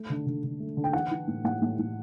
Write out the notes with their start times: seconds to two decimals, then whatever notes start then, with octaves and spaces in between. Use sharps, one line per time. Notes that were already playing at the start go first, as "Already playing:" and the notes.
Already playing: A3
0.10 D3
0.26 D3
0.43 D3
0.60 A3
0.77 D3
0.84 G5
0.93 E3 F#5
1.11 E3
1.28 A2
1.44 A2 F#5
1.62 A2
1.79 A2